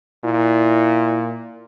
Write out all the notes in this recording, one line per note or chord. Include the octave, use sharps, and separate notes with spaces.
A#2 E4